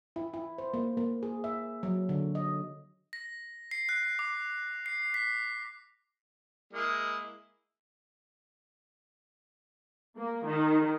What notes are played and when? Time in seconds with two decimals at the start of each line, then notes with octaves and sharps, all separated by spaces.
0.16 E4
0.34 E4
0.58 C5
0.74 A#3
0.97 A#3
1.23 G#4
1.44 E5
1.83 F#3
2.09 D3
2.35 D#5
3.13 A#6
3.71 C7
3.89 F#6
4.19 D6
4.86 C7
5.14 B6
6.73 G#3 A#3 E4
10.17 A#3
10.47 D#3